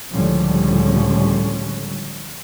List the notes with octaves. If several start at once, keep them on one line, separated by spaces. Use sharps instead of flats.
C#2 A2 D3 F3 G3 C#4